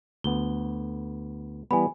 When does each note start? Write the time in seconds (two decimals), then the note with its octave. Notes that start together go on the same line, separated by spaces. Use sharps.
0.24 D2 B3 G7
1.71 E3 G3 B3 G#5 B5